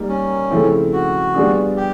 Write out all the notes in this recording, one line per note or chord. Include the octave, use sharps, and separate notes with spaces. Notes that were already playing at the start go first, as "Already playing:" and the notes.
Already playing: G3 A#3 D#4
C#4
C#3 F3 A3 C4 E4
F#4
G3 B3 D4 F4 G#4
G4